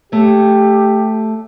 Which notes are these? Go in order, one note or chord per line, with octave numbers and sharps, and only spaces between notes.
A3 G4 C#5